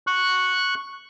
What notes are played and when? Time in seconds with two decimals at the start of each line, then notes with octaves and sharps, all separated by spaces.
0.07 C#6 F#6